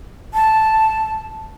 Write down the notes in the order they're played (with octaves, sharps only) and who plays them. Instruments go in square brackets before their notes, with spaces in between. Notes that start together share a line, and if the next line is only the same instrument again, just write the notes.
[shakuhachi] A5